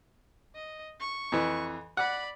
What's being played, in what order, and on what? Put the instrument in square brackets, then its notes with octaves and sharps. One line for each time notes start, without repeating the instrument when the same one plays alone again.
[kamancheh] D#5
C#6
[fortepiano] F2 E3
[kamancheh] D5 B5 [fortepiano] F#5